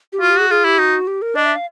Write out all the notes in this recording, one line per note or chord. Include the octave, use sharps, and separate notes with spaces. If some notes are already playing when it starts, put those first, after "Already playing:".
G4
F4 F#4
G4
F#4 G#4
F4 G#4
E4 G4
D#4 F#4
G4
A#4
D4 D#5
E5
F5